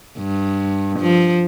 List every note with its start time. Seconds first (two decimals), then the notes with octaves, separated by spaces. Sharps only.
0.18 G2
0.99 F3